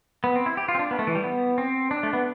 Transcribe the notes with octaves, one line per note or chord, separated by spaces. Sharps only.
B3
C4
E4
G4
F4
C4
D4
B3
A3
E3
G3
B3
C4
D4
A3
B3